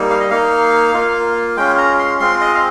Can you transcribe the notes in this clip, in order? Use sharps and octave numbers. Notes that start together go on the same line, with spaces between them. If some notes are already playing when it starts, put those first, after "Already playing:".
Already playing: G3 A#3 D#4
F5
D#5
A#3 D#4 F5
A#3 F4
G#3 C#4 F4 G5
A#5
C6
G#3 C4 F4 C6
D#5
F5